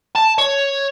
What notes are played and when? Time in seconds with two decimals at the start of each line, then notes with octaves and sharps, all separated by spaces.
0.15 A5
0.38 C#5